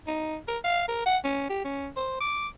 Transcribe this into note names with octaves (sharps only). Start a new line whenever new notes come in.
D#4
A#4
F5
A#4
F#5
C#4
G4
C#4
C5
D6